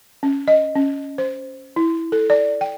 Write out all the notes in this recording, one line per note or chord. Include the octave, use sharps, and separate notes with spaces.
C#4
D#5
C#4
C5
E4
A4
D5
G5